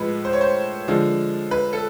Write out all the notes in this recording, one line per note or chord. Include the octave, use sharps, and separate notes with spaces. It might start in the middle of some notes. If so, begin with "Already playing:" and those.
Already playing: A2 F3 G#3 B4
C5
C#5
C5
D3 F3 G#3
B4
A4